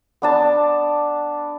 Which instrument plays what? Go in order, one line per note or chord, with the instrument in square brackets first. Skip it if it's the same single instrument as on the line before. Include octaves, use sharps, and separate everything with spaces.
[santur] B3 D4 A5